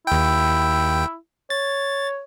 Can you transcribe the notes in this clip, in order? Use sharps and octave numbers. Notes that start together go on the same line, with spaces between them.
D#2 E4 G5
C#5 A6